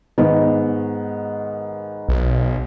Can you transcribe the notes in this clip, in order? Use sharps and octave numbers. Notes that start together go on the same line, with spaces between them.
G#2 D#3 B3
B1